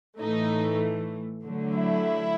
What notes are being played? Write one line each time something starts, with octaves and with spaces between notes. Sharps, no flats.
A2 E3 A3 D#4
D3 F#3 A3
E4